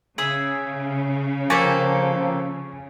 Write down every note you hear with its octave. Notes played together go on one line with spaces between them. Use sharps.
C#3 G#4 E5 D#6
F3 A#3 G4 A4 G#5 C#6 A6